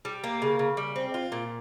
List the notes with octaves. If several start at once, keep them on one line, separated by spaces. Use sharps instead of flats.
G3
A#3
C#3
C#3
G3
C4
F4
A#2